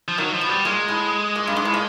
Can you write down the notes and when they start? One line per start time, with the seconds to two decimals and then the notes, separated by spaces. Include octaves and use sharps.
0.08 F3
0.18 D#3 F#3
0.33 F3
0.41 B2
0.49 G3
0.65 A#2 G#3
0.88 A2
1.35 A#2
1.47 G2
1.56 G#2
1.65 A2
1.74 A#2